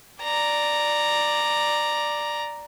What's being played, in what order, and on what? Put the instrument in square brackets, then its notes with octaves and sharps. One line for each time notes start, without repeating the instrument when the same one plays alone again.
[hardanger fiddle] D5 A#5